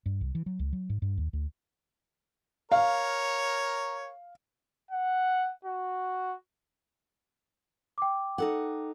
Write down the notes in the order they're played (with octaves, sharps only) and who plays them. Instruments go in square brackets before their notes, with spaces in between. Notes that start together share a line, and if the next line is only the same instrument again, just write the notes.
[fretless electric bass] G2
C2
E3
F#3
C#2
F#3
G#2
G2
D#2
D2
[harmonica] A#4 C#5 [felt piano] F5
[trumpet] F#5
F#4
[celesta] G5 D6
[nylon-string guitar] D#4 A4 F#5